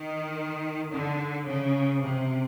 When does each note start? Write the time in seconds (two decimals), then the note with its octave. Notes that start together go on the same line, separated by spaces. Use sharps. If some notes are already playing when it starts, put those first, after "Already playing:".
Already playing: D#3
0.92 D3
1.47 C#3
2.03 C3